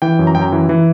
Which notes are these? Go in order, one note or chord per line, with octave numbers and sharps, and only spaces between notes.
E3 G5
F#2
A#5
F#2 G5
A#5
E3
E3